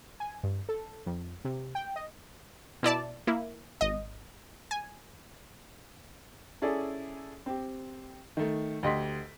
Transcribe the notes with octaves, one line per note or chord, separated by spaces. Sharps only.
G#5
G2
A4
F2
C3
G5
D#5
B2 E4 D5 A5
A#3 E4
G#1 D#5
G#5
C#4 E4 G#4 A4 D5
C4 G4
D#3 A3
D2 G4 D#5 F#5 C6 B6